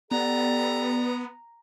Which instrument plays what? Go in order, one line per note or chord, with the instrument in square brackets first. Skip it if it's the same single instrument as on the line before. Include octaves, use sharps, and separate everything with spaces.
[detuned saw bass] B3 [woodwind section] G4 A4 D5 [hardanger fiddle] A#5